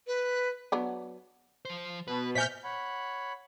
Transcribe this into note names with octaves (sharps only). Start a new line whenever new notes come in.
B4
F#3 B3 D4
F3 C5
B2 B4
A#2 C5 E5 G#5 F6 G6 B6
C#5 F#5 B5